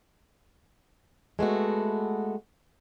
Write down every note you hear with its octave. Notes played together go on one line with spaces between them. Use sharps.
G#3 A3 B3 F#4